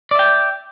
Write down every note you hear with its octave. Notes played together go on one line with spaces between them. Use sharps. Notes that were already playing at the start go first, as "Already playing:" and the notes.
D5 E5 G5